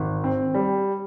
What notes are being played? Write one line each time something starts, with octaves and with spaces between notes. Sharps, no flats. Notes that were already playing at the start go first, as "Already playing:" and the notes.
Already playing: G#1
C4
G3